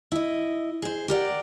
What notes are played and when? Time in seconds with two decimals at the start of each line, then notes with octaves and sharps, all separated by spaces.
0.12 E4 D#5
0.82 G#4 C5
1.08 G4 A#4 D5 F#5